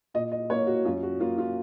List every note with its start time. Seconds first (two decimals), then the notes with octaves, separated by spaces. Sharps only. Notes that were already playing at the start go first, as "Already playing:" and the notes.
0.14 A#2 D#5
0.31 D#5
0.50 A#3 C#5
0.67 F#4
0.85 F#2 F4
1.03 F#4
1.20 A#3 F4
1.38 F4